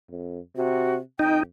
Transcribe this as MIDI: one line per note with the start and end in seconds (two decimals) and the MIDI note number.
0.11 0.39 41
0.56 1.00 48
0.56 0.95 66
1.19 1.45 41
1.19 1.43 63
1.19 1.39 79